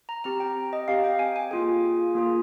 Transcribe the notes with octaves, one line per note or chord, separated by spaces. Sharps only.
A#5
C4 G4 A#5
G5
D#5
C4 G4 F5
G5
G#5
G#5
A#3 F4 G#4 G#5
A#3 F4 G#4